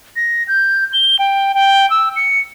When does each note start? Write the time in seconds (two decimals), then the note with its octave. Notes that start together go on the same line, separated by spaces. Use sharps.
0.16 A#6
0.48 G6
0.93 G7
1.19 G5
1.55 G5
1.90 E6
2.16 C#7